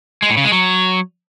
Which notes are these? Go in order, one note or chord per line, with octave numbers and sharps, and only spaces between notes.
G#3
A2
C#3
G#3
F#3